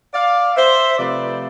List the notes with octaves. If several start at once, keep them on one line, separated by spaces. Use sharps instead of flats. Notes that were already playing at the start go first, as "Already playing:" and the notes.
D5 F5
C5 E5
C3 F3 A3 B4 D5